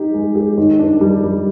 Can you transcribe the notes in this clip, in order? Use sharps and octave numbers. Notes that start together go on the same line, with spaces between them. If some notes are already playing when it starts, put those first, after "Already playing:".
Already playing: D#4 G4
G#3
G4
D#3
D4
G3
G3